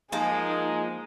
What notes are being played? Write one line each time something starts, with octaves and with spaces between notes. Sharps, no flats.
F3 G#3 A#3 D#4 G#4